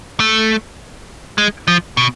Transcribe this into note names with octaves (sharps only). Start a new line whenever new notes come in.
A3
G#3
F3
B2